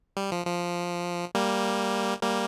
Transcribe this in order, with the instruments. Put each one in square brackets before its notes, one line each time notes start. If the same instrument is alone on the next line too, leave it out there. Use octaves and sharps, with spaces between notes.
[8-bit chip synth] G3
F3
F3
G3 A#3
G3 A#3